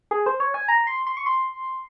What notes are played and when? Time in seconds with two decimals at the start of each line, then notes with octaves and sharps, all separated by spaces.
0.11 G#4
0.26 C5
0.40 C#5
0.54 G#5
0.68 A#5
0.87 C6
1.07 C6
1.17 C#6
1.26 C6